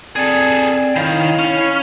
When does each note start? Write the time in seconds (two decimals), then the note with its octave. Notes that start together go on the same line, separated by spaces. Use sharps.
0.16 C4 G#4 A4 D5 G5
0.96 D#3 E4 C#5 F5
1.39 C#4